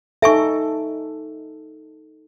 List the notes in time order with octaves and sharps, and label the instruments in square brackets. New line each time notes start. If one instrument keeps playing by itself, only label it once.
[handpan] D#4 A4 [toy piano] E5 G#5 C#6